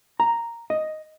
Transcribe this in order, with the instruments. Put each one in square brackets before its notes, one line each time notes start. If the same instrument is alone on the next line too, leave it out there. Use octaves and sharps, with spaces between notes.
[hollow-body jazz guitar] A#5
D#5